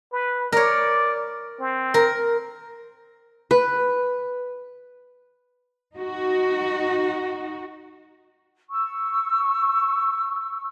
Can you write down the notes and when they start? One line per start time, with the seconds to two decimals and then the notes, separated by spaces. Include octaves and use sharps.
0.12 B4
0.52 A#4 C#5 D5
1.60 C4
1.94 A#4
3.51 B4
5.96 D#4 F#4
8.70 C#6 E6